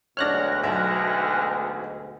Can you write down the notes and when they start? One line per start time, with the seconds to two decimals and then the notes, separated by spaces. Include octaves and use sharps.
0.17 D2 G#2 B2 D4 C#5 F6 F#6 A#6
0.63 B1 E5